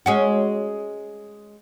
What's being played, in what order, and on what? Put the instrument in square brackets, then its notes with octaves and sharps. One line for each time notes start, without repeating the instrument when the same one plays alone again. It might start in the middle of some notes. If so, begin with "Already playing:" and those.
[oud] G#3 C#4 F#4